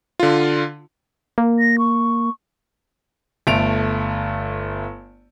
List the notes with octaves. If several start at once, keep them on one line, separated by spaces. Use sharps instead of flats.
D3 F4
A#3
A#6
C#6
G1 A3 D7 F7